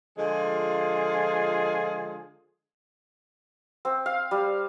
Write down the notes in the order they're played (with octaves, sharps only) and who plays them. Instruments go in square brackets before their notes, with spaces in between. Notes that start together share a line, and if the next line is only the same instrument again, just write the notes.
[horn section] D3 F3 G#3 F4 G#4
[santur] C4
F5
G3